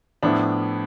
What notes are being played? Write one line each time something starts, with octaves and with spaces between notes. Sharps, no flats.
A2 F3 B3 D4 E4